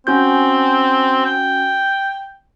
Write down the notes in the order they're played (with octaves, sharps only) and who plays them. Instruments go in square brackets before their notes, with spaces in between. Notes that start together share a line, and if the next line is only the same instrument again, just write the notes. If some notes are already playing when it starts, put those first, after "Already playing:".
[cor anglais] C4 [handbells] C#4 F#4 G6
[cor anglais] G5